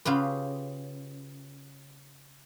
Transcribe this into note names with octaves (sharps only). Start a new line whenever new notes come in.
C#3 F4 G4 B4